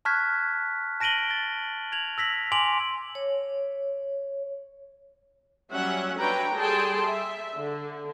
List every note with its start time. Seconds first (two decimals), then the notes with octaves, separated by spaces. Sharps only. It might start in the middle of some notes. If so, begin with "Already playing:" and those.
0.05 A5 C#6 F6 F#6 G#6 B6
1.00 A5 A#6 D7 D#7 F#7 G7
1.30 A6 A#6
1.92 G#6 F7 F#7
2.18 E6 A#6 B6 F#7
2.52 G#5 C6 D6 D7 F7 F#7
3.15 C#5
5.72 F#3 G3 C#4 E5 F#5
6.18 D4 F#4 B4 C#5 G5 A#5
6.55 G3 G#4 A4 G5 A5 C6
7.05 E5
7.55 D3